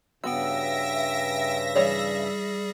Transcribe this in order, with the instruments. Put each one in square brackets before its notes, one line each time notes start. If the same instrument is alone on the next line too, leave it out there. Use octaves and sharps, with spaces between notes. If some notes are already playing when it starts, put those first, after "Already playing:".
[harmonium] G2 C#3 [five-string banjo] B3 F#4 [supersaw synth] E5 A#6 [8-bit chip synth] G5 E6
[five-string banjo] E3 C#5 D5 [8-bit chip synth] G3 G#4